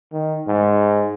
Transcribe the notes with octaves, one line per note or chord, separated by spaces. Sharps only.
D#3
G#2